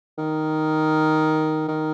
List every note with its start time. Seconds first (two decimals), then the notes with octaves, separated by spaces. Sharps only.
0.18 D#3
1.68 D#3